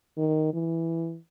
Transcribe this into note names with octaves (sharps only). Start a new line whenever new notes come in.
D#3
E3